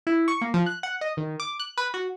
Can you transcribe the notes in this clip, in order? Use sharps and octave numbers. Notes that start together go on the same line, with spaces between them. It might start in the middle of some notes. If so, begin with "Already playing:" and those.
E4
C#6
A#3
F3
F#6
F#5
D#5
D#3
D6
F#6
B4
F#4